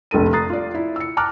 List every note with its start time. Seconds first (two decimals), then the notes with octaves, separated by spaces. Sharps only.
0.11 F1 A#1 A4 D#7
0.33 A#5 D#6 F#6 A6 C7
0.50 F4 D5
0.75 E4
0.96 E6 C#7
1.17 A5 A#5 D6 F6 F#6